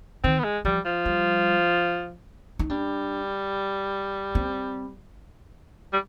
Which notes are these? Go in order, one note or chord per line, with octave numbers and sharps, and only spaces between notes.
D#3 C4
B3
G#3
F3 G3
F3
G3
D#4
G3 D4
C4
G3